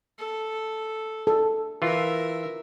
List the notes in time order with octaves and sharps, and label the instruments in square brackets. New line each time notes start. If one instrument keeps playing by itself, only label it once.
[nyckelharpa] A4
[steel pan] A4
[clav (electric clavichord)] E3 F4 [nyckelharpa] A#4 E5